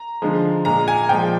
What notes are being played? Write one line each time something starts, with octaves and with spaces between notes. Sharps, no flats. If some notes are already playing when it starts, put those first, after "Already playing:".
Already playing: A#5
D3 F3 G#3
A#2 G#3 A#5
G#5
A#2 F3 G#3 G5